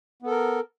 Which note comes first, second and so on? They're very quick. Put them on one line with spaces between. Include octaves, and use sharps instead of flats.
B3 A4 A#4